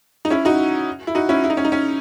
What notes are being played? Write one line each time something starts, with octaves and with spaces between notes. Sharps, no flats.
D#4
C#4 E4
D#4 F#4
E4
D#4 F#4
C#4 E4
E4
D#4
C#4
D#4
C#4